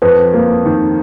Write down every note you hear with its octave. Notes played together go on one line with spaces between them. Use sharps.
F2 B4
A#3
D#3